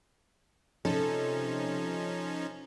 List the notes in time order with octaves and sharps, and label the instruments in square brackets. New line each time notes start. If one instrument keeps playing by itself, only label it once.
[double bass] C3 [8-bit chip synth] F3 C#4 D#4 [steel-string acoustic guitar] A4